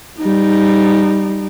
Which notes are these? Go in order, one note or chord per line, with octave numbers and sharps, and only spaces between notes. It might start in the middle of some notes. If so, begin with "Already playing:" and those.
G3 D#4